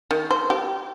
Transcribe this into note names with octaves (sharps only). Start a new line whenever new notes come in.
D#3
C5
G4